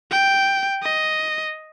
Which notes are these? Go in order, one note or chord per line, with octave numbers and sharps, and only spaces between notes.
G5
D#5